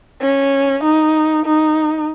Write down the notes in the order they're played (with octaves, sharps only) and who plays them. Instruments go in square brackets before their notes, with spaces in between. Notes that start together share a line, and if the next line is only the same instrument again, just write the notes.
[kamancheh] C#4
D#4
D#4